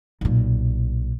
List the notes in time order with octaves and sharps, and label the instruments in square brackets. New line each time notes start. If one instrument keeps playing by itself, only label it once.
[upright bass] B1 A#2